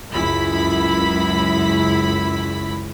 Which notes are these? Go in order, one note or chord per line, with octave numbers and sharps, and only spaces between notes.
C#2 F#2 E4 B5 B6